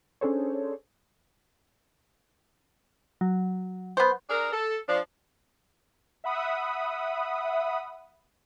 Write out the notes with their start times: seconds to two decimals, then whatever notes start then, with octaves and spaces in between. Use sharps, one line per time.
0.21 C#4 D4 G#4 A4 C5 C#5
3.21 F#3
3.97 B3 C5
4.29 D4 G#4 A#4
4.52 A4
4.88 F3 D4
6.24 E5 F#5 B5 D#6